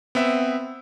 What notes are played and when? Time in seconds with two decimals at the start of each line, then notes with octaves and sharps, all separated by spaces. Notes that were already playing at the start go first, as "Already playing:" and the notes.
0.15 B3 C4 E5 E6